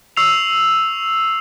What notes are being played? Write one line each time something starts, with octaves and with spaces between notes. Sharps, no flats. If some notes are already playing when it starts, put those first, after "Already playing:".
C#6 E6 C7 F7